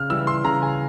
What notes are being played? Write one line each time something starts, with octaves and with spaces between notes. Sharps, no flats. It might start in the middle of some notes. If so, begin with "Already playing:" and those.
Already playing: C#3 F6
E3 G3 E6
C6
C#3 A#5
G#5